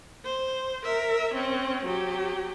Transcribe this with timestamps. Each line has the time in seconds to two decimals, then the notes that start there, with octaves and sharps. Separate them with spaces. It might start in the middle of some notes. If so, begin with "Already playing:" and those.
0.24 C5
0.85 A#4 E5
1.34 C4 C#4
1.85 F#3 G4